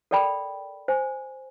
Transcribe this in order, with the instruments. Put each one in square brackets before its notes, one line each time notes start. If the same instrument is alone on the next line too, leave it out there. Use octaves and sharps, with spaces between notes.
[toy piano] A4 A#4 D5 G5 B5
C5 G#5